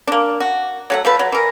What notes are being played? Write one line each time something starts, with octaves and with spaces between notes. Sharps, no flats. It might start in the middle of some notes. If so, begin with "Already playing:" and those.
A#3 D4
F#4
F#3 A3 F#5
F3 A3 B4
F#3
E3 A#4